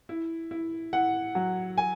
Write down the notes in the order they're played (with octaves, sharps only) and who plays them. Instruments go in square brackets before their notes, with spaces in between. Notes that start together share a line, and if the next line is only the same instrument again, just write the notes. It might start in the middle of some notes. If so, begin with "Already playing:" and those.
[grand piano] E4
E4
E4 F#5
F#3
G#5